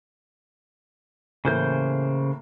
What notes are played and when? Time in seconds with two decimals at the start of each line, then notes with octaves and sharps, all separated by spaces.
1.45 A2 C#3 E3 A#3 C5 G6